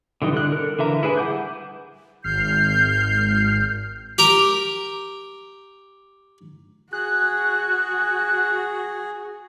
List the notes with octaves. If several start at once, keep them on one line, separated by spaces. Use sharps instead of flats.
D3 E3 G3 D#4
D3 F#6
A4 A#4
D3 E3 E5 A#5
E4 G#4 B4 G#5
G3 F#5 D6 G6
G#1 F6 G6 C7
G4 A#4 A#5
F#4 G#4 F#6